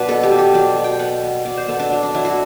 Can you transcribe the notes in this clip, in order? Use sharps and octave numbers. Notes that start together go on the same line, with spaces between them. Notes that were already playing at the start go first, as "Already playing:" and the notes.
Already playing: B2 F#3 D4 B4
B3 A4
G4
B2
G4
F#3 D5
B2
G5
B3 F#5
B3
B2 D5
C5
B3 A4
D4
F#3
D4
F#3 E4
F#4